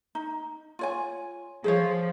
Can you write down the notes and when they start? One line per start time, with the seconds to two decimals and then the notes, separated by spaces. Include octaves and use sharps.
0.15 D#4
0.79 F4 C#5 G#5
1.64 F3 G#4 C5 C#5